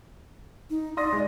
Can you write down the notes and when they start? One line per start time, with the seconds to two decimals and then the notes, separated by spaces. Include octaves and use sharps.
0.70 D#4
0.97 D5 C6 D#6 A#6
1.13 G#3